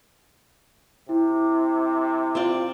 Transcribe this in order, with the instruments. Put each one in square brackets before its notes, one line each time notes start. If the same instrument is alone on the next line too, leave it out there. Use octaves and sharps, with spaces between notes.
[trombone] C3 [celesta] E4
[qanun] C4 F4 D5